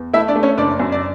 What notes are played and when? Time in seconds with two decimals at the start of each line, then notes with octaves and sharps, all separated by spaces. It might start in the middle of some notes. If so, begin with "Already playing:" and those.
Already playing: E2
0.13 A3 E4 E5
0.28 D4 D5
0.36 A3
0.43 C#4 C#5
0.57 F#1 D4 D5
0.79 F#2
0.92 D5